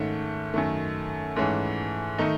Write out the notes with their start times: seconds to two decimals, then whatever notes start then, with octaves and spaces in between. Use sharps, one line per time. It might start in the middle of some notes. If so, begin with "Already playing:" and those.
Already playing: G#2 D#3 A3 C#4
0.54 F#2 D#3 A3
1.36 G#2 E3 A3 C#4 G#4
2.18 D#3 A3 D#4